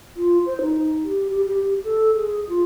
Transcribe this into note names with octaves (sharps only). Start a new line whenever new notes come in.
F4
C5
D#4
G4
G4
G4
A4
G#4
F4